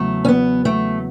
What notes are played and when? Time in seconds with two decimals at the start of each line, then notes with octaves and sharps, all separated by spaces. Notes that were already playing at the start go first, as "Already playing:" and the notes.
Already playing: E2 C#3 F#3 A3
0.25 C#4
0.28 B3
0.65 A3